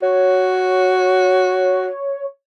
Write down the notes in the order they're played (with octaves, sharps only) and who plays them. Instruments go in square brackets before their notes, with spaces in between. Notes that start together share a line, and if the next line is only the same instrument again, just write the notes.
[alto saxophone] F#4 [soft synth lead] C#5